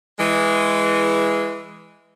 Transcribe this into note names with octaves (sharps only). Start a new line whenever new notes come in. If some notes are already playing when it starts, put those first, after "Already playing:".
E3 G#3